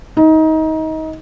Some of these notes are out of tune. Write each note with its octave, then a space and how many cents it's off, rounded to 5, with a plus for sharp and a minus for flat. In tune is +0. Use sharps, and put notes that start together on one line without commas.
D#4 +25